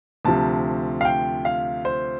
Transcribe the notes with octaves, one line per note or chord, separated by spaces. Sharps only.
D2 C3 F3 A5
F5
G5
F5
C5